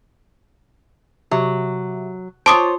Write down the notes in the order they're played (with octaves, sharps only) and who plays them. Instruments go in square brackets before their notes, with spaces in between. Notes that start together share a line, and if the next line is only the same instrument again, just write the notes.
[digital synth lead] C3 [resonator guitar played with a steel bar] F#3
[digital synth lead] F4 [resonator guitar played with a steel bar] C5 C#5 [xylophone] A5 D6 D#6